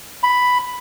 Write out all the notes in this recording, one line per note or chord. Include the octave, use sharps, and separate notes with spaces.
B5